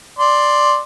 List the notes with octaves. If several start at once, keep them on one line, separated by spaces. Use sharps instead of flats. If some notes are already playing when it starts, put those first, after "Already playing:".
D5 C6